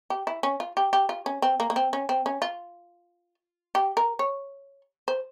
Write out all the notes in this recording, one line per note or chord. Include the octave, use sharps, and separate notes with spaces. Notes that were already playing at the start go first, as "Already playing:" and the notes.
G4
E4
C#4
F4
G4
G4
F4
C#4
C4
A#3
A#3
C4
C#4
C4
C#4
F4
G4
A#4
C#5
C5